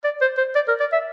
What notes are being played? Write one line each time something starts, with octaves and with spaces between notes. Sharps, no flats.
D5
C5
C5
D5
A#4
D5
E5